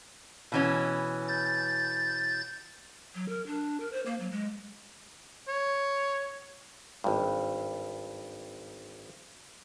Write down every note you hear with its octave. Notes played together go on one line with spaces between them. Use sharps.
B2 E3 C#4
G6 A6
F#3
A#4
D4
A#4
C5
A#3
F#3
G#3
C#5
G#1 G2